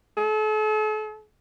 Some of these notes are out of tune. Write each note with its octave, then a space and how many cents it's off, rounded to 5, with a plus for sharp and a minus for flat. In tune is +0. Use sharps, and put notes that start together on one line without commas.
A4 -40